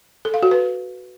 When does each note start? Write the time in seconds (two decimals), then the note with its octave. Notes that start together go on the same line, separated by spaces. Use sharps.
0.25 A4
0.34 F5
0.43 F#4
0.51 B4